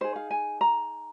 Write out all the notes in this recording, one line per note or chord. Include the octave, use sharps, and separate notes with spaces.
D#4 G#4 C5
F5
G#5
A#5